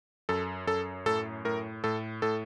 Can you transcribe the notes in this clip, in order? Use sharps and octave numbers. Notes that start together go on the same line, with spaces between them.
F#2 A4
F#2 A4
A2 A4
A2 A#4
A2 A4
A2 A4